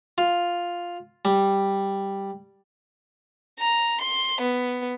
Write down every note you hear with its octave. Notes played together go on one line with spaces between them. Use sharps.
F4
G3
A#5
C6
B3